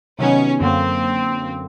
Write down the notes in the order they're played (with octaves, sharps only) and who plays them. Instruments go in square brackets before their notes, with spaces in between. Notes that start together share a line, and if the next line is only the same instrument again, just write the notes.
[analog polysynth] C3 D#3 F#3 B3 D#4 [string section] C#4
[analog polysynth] F#2 D3 F#3 A#3 [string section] C4